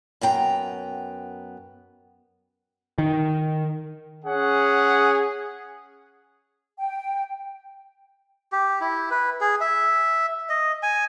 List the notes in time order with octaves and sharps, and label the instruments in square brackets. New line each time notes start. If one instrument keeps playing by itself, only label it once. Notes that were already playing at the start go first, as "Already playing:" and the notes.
[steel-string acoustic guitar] F#2 B3 G5 A#5
[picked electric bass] D#3
[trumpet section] C#4 G#4 F#5
[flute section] G5
[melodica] G4
E4
B4
G#4
E5
D#5
G#5